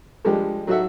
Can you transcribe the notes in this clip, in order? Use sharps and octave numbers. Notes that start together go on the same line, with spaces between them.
F3 G3 G#3 D4 G4
F#3 D#4 F#4 A4 E5 F#5